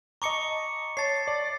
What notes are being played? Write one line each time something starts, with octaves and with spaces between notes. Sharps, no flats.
D#5 A5 A#5 C#6 D6 C#7
C#5 A5 A6 C7
D5